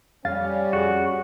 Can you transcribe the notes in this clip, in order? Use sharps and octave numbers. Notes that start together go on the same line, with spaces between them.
F2 G3 C#4 F5 A6
F2 F#4 G#4